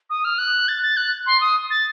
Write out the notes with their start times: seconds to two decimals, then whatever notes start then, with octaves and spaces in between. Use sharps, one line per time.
0.10 D#6
0.25 F6
0.38 F#6
0.68 A6
0.82 A6
0.97 F#6
1.26 C6
1.41 D#6
1.71 A6